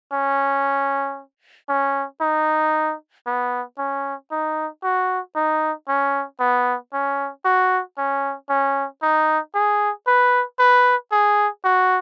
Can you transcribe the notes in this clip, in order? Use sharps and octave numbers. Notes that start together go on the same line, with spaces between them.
C#4
C#4
D#4
B3
C#4
D#4
F#4
D#4
C#4
B3
C#4
F#4
C#4
C#4
D#4
G#4
B4
B4
G#4
F#4